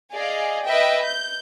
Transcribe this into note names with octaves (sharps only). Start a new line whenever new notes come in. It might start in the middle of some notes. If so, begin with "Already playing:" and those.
G#4 D5 D#5 F5
B4 D#5 E5 G5
G6